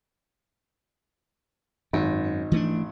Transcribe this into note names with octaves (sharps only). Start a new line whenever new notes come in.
G#1 F#2
E3 A3 D4